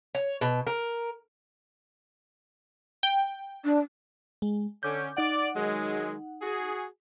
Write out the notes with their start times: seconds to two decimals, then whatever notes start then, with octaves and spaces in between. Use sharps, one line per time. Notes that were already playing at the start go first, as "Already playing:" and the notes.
0.15 C#5
0.41 B2
0.67 A#4
3.03 G5
3.64 D4
4.42 G#3
4.83 D3 C#4 D6 G6
5.17 D#4 D5 F#5
5.55 D#3 F#3 G#3
6.42 F#4 G#4